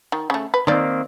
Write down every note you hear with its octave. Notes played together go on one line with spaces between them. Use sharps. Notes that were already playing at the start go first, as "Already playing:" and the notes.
D#3
C#3 A3
B4
D#3 A#3 C4 D#4 D5